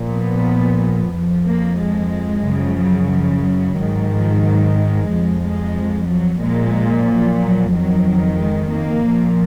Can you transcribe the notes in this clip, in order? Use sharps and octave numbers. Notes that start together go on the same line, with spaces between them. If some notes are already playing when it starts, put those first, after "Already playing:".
Already playing: A#2 F3
B3
F2 F3
A#3
G#3
F#2 C#3 F3
F#3
F3
F#3
G#2 D#3
F3
F#3
G#3
F2 F3
G#3
F#3
A#2 F3 G#3
F#3
F#3
F2 D#3 F#3
G#3
A#3
A#2 F3